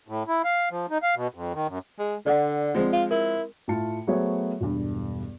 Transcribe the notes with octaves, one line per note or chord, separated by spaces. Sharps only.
A2
E4
F5
F3
D#4
F5
B2
F2
D#3
F#2
G#3
D3 D5 F#5
F3 G#3 C4
F4
E4 A#4
A2 A3 F4 A5 C#7
F#3 A3 B3 G#4 C5 C#5
E1 G2